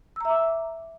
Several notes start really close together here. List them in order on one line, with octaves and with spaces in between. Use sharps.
E6 A#5 E5 D6